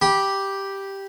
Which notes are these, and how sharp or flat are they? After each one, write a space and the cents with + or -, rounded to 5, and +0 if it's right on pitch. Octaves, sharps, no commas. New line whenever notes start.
G4 +0 B5 -20